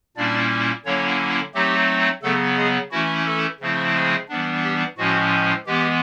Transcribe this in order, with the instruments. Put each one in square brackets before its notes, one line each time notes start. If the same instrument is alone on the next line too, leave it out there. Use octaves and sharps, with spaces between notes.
[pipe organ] A#2 G3 A#3 C#4 D4 E4 D5
D3 F#3 A#3 C#4 E4 C#5
F#3 A3 C4 D#4 G4
C#3 F#3 A3 B3 A4
G#3 G#4
E3 A3 C#4 E4 F#4
A3 A4
C#3 F3 A3 C4 E4
G#3 G#4
E3 G3 B3 D4
G4
A2 F3 G#3 C#4 F#4
E3 G#3 B3 G4